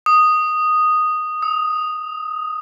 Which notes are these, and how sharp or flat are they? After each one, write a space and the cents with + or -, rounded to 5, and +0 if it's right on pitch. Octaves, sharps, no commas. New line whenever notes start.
D#6 -5
D#6 +45